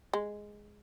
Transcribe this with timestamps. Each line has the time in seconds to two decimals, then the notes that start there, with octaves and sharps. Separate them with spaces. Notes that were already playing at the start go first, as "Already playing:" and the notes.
0.13 G#3